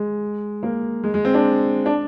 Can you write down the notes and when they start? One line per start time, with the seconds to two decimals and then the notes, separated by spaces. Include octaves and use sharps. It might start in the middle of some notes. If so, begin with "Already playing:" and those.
Already playing: G#3
0.63 A#3
1.04 G#3
1.14 G#3
1.25 C4
1.34 D4
1.86 D4